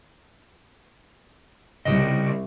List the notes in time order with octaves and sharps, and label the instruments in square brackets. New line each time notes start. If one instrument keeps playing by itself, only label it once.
[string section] C2 [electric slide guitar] C#3 D#5